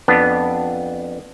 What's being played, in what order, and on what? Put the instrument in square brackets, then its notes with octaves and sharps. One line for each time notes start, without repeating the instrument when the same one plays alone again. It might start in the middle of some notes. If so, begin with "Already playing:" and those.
[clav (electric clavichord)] F2 B3 D4